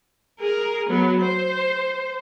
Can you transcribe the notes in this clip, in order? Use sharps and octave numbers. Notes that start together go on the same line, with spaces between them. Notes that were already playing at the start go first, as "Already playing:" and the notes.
G#4 A#4
F#3 B3
C5